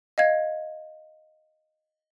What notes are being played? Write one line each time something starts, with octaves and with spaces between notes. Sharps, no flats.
D#5 F5 G#6